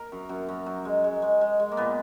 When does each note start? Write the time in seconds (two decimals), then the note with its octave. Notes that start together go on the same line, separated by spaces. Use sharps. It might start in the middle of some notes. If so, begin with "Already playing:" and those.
Already playing: A#4
0.12 F#2
0.29 F#2
0.49 F#2
0.66 F#2
0.85 G#3
1.04 G#3
1.22 G#3
1.41 G#3
1.60 G#3
1.72 A#3
1.77 A#2 B3